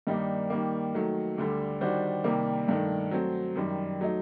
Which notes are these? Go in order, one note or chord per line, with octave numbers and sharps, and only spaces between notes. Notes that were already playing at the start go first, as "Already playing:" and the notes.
G2 D#3 G3 A#3 D#4
D#3 G3 A#3
D#3 F#3 A3
D2 D3 G3
D#3 G3 D4 F#4 C5
C3 D#3 G3 A#3
G2 D#3 A3
F#3 A3 C4
F#2 D#3 G3
F#3 A3 D#4